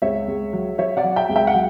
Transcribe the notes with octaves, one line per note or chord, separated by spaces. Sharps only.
C#2 C#5 E5
C#2
F#3
F#3 C#5 E5
D5 F#5
F#3
E5 G5
C#2
E5 G5
F#5
F#3